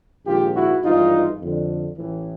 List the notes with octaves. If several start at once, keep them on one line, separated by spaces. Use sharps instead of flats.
A#1 G#2 D#3 F4 G4
E4 F#4
G#1 G2 E3 D#4 F4
F2 D3
A1 A2 E3